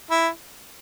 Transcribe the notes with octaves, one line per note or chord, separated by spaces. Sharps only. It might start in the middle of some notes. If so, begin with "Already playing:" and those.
E4